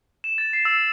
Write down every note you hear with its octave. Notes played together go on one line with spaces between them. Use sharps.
E7
A6
C7
E6